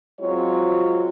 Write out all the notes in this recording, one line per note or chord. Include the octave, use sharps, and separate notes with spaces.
F#3 G#3 C4 F4 C#5